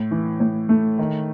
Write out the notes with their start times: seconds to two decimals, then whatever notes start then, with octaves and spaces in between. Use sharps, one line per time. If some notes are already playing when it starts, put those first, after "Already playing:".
Already playing: A2
0.11 E3
0.40 A2
0.69 A3
0.99 D#3